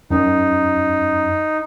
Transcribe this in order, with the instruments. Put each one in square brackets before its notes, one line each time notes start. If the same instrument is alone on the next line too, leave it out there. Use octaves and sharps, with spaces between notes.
[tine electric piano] F#2 [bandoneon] D#4